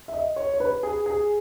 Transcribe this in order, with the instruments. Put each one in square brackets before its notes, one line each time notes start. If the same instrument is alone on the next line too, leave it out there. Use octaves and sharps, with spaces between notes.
[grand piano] E5
D#5
C#5
C#5
B4
G#4
G#4